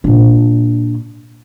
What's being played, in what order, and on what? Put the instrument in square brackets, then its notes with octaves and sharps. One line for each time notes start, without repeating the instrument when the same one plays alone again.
[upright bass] A#2 D4